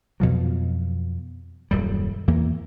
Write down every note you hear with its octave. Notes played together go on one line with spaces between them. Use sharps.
F2 B2 F3 F#3
D#1 F#2 G3
E2 E3 A#3